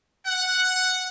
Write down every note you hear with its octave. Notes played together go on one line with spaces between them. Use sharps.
F#5